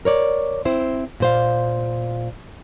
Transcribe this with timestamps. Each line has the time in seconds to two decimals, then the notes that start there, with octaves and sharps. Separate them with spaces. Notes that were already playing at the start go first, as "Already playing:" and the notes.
0.05 A#4 C#5 D5
0.65 C4 E4 C5
1.20 A#2 C5 F5